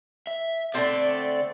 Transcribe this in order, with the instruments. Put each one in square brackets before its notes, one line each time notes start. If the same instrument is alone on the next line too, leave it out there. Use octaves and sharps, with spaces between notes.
[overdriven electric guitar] E5
[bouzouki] D3 A3 C4 [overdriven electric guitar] D5